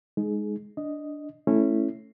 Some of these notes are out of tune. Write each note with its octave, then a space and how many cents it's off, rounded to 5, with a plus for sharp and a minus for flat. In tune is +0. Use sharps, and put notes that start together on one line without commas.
G#3 +0 D#4 +0 G#4 +20
D4 +0 D#5 +0
A3 +0 C#4 -15 E4 +0